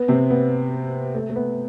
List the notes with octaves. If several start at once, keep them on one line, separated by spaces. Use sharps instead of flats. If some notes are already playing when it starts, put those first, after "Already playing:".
Already playing: B3
C3 C4
B3
A3
A3
B3